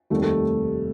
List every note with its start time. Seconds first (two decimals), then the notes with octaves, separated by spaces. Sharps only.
0.10 F1 D#2 D#3 G3 A3
0.22 A3